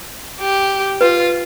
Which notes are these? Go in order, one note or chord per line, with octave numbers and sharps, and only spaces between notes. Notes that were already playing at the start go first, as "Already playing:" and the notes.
G4
F4 B4